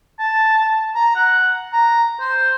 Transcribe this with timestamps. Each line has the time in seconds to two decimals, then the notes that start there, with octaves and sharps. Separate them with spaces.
0.19 A5
0.95 A#5
1.15 F#5
1.73 A#5
2.20 C5